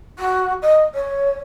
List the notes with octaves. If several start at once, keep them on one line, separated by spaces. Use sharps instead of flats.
F#4
D#5
C#5